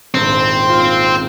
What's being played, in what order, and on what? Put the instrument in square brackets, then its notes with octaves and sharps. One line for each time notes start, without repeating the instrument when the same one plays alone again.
[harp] D#1 G#1 [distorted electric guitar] C4
[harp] F4